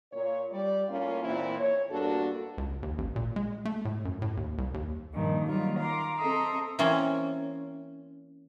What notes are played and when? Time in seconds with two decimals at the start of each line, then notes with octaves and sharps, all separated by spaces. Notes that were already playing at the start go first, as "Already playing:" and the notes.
0.12 A#2 C#5
0.52 G3 D5
0.88 A2 A#3 C#4 F4
1.23 E2 A#2 E3 A#3 C4 E4
1.59 C#5
1.90 E2 G2 A#3 D4 F#4 A4
2.58 C#2
2.83 D#2
2.98 A1
3.16 A#2
3.36 G#3
3.65 A3
3.85 A2
4.05 F#2
4.22 A2
4.37 D#2
4.58 C2
4.74 D#2
5.13 G2 A#2 D#3 F3
5.47 D#3 F#3 G3 A#3 F4
5.78 F5 A#5 C6 D6
6.16 C4 A4 D#5 E5 A#5 C6
6.79 E3 A#3 C4 C#4